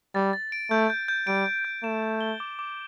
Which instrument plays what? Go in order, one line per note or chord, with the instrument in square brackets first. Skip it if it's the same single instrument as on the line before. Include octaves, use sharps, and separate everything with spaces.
[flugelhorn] G3 [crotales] A6
[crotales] A6
D7
[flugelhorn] A3 [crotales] G6
[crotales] G6
G6
[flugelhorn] G3 [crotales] D7
[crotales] D7
G6
[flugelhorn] A3 [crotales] E7
[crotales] E7
G7
D6
D6